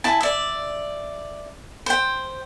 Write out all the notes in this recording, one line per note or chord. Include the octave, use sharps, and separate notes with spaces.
E4 G#5 A5
D5 E5
C5 G5